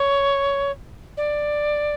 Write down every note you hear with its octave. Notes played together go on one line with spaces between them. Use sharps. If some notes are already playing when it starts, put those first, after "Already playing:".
Already playing: C#5
D5